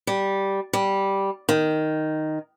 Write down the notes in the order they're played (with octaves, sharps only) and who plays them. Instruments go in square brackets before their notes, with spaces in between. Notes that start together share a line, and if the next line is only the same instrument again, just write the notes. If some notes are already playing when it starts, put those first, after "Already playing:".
[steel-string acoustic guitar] G3
G3
D#3